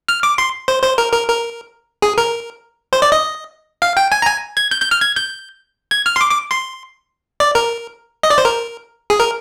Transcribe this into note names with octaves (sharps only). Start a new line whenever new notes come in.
F6
D6
C6
C5
C5
A#4
A#4
A#4
G#4
A#4
C5
D5
D#5
F5
G5
G#5
A#5
G#5
G#6
G6
G6
F6
G#6
G6
G#6
F6
C6
D6
D6
C6
D5
A#4
D#5
D5
C5
A#4
G#4
A#4